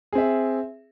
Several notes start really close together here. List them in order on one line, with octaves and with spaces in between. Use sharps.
G#4 C4 E5